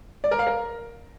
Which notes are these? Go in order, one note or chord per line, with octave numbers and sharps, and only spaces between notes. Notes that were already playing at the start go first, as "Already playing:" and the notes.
D5
A#4
F5
A#4